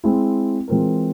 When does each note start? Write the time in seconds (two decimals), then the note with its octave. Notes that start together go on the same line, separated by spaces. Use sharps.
0.04 G#3 C4 E4
0.68 E3 G#3 C4 F4 A#4